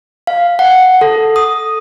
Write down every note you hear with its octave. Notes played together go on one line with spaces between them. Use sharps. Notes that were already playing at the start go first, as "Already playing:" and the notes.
F5
F#5
A4
D#6